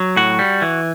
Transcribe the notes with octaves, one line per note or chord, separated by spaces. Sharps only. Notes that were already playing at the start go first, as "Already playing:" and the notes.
Already playing: F#3
A2 F#4
G3
E3